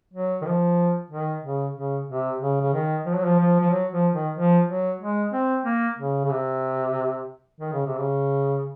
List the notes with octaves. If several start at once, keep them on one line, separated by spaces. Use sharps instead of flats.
F#3
D#3
F3
D#3
C#3
C#3
C3
C#3
C#3
D#3
F3
F#3
F3
F3
F3
F#3
F3
D#3
F3
F#3
G#3
C4
A#3
C#3
C#3
C3
D#3
C#3
C3
C#3